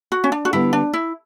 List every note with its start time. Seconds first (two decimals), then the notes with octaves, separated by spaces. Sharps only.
0.12 F#4
0.24 C#4
0.32 D4
0.45 F#4
0.53 D3 G3 B3 E4
0.73 D4
0.93 E4